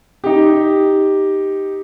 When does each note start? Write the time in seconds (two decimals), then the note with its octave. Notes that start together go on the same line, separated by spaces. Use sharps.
0.24 D#4 G4